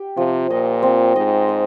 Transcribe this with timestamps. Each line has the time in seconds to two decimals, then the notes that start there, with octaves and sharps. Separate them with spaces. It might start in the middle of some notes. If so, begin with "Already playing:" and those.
Already playing: G4
0.17 C3 F3
0.50 A#2 D#5
0.83 C4
1.16 G#2 D#5
1.49 D#5